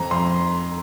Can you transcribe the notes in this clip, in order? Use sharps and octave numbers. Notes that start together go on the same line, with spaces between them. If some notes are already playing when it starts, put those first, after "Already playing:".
Already playing: F2 A#5
C6